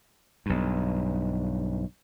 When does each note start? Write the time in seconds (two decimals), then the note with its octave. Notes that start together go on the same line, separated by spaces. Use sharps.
0.46 B1 G2